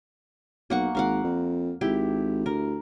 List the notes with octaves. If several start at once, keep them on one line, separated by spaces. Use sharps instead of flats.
B1 A#3 F#5 C#6
G#1 A#4 F5 F#5
F2
G#1 E4 G4
D2 A#4